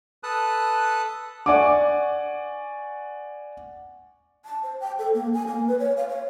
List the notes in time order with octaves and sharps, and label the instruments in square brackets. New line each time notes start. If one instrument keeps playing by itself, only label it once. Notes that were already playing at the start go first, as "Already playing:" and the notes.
[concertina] A4 B4 A5 D#6 F#6
[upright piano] D5 F#5 G#5 C#6 D6
[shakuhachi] A5
C5
G5
A4
A#3
G#5
A#3
B4
C#5
F5
C#5